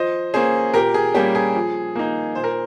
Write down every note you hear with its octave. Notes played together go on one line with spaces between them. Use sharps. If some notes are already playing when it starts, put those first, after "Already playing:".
Already playing: F3 C5 D#5
A#3 C#4 G#4 C5
A#2 G4 A#4
G#4
G3 A#3 C#4 G4
G#4
F3
A#3 D#4
A#2 C5
A#4